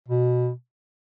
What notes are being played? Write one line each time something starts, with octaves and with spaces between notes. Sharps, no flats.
B2